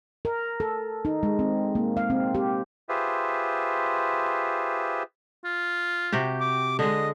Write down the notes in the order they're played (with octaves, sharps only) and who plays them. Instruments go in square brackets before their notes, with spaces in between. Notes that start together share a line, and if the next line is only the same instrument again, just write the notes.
[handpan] A#4
A4
D#4
G#3
C4
A#3
F5
C4
G4
[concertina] F4 G4 G#4 B4 C5 E5
[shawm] F4
[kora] C3 F#4 G4
[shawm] D6
[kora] D3 G#3 [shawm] D#5